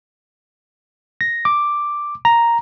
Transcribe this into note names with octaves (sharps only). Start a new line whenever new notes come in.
A#6
D6
A#5